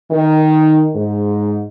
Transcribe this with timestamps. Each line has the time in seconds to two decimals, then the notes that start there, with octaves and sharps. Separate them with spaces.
0.11 D#3
0.95 G#2